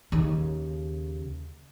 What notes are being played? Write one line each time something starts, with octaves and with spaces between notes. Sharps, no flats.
D#2 C#3